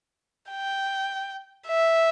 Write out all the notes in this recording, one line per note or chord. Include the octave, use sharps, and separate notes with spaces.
G5
E5